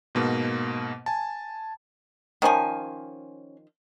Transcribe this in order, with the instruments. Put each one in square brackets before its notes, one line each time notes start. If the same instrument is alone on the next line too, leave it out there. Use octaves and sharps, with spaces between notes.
[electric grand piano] G#2 B2 A#3
G#5 A5
[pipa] D#3 F3 [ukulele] C#4 C5 G#5